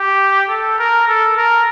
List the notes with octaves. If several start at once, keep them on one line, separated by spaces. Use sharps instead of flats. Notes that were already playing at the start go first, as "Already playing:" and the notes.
Already playing: G4
A4
A#4
A4
A#4